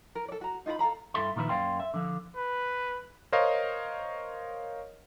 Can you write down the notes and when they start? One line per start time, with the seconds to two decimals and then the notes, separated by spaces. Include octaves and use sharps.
0.15 A#4
0.28 A4 D5
0.41 F#4 A#5
0.66 D#4 F4 A#4 B5
0.79 A4 F5 A#5 B5
1.14 G2 E4 A4 E5 C6
1.36 A#2 D#3 F3 E4 B4
1.49 F#2 A#3 D5 F5 G5 C6
1.80 E5
1.94 D3 F3
2.36 B4
3.32 A#4 C5 C#5 D#5 F5